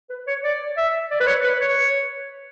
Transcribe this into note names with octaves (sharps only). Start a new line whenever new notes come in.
B4
C#5
D5
E5
D5
B4
C#5
B4
C#5